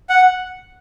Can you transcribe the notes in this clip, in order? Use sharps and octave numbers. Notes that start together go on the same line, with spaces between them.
F#5